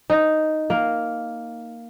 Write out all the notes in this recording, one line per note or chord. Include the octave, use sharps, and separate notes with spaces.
D#4
A#3